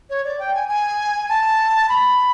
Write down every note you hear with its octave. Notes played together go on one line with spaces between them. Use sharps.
C#5
D5
G5
G#5
G#5
A5
B5